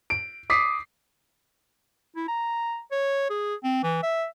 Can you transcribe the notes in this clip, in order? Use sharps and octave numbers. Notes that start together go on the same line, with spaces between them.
D7
D6 D#6 B6 C7
E4
A#5
C#5
G#4
C4
E3
E5